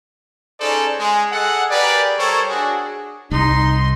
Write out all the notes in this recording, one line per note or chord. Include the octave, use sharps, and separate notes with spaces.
C#4 D#4 G#4 A4 C5 D5
G#3
G#4 A4 D#5 F#5
G4 G#4 A#4 B4 D5
G3 A4 A#4 C5 C#5
D4 F#4 G#4
C2 D#4 C6